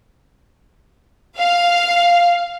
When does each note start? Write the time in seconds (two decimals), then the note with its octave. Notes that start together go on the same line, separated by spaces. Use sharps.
1.37 F5